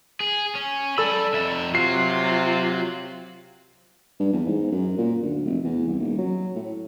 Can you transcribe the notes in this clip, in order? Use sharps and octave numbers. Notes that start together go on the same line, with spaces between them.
G#4
C#4
A4 D5 B5 E6
F2 E5
C3 F#3 F4 F#4 C7
G2
E2
G#2
F#2
A#2
D2
F1
E2
C2
D#1
F#3
A2